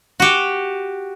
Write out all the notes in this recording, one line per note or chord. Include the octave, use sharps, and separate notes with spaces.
F#4 G4